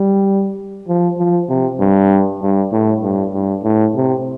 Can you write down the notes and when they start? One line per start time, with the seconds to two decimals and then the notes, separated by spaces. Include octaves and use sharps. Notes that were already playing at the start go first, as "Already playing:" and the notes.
Already playing: G3
0.88 F3
1.18 F3
1.49 C3
1.79 G2
2.41 G2
2.72 A2
3.03 G2
3.33 G2
3.63 A2
3.95 C3